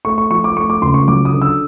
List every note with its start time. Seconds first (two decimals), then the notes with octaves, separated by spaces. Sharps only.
0.05 A3 C#6
0.18 C#6
0.30 F3 C#6
0.44 D6
0.56 A3 C#6
0.70 D6
0.82 C#2 C6
0.94 C#6
1.08 F#3 D6
1.25 D#6
1.33 D3
1.42 E6